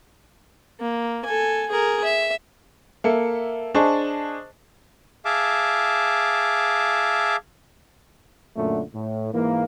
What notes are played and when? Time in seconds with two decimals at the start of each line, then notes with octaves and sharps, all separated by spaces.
0.80 A#3
1.25 A4 G#5
1.70 G#4 A#4
2.04 E5
3.04 A#3 A4 E5 C#7
3.75 D4 G#4 C5 D#5 A5 C#6
5.25 G#4 E5 F5 A5 D6
8.57 F#2 A#2 D3 A3
8.95 A2
9.32 G#2 E3 A#3